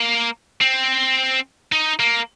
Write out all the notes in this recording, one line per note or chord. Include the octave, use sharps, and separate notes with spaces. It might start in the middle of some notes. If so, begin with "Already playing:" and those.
Already playing: A#3
C4
D#4
A#3